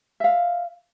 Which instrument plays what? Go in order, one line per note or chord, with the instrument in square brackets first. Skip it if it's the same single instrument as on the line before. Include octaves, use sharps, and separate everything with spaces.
[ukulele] E5 F5